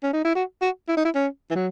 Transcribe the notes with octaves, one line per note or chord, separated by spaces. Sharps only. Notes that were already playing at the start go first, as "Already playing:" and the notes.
C#4
D#4
E4
F#4
F#4
E4
D#4
E4
C#4
E3
F#3